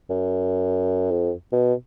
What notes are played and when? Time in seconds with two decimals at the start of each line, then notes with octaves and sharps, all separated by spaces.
0.10 F#2
1.11 F2
1.52 B2